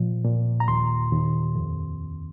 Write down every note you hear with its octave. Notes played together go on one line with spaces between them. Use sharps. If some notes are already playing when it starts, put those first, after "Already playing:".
Already playing: A#2 F3
A#2
A#5
D#2 C6
D#2
F2